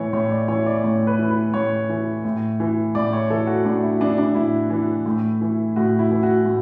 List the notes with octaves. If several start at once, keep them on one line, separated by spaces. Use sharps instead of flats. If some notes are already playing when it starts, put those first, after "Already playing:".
Already playing: A2 E3 C#5
A2 C#5
D5
E3 C#5
D5
A2 C#5
B4
E3
B4
A2 C#5
E3
A2
E3
A2 D5
C#5
E3 A4
F#4
A2 D4
E4
E3 D4
D4
A2 E4
E3
A2
E3
A2 F#4
E4
E3
F#4
A2